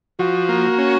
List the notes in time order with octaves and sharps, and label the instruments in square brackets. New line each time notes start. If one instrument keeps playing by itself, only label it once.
[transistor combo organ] F3 [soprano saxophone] F#4
[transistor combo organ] A#3
C#4